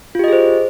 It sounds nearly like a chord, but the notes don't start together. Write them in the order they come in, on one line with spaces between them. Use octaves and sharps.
F4 G4 D#5 G#4 C5